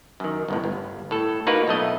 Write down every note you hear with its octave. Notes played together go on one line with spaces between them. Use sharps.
F#2 D#3
G1 C#2 A2
G1
A2 A4
A#3 D#4 F4 F#4 A#4 B4
B1 A3 D#5